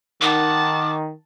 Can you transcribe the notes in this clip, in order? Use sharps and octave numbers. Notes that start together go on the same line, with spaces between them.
D#3 F#5 A5 D6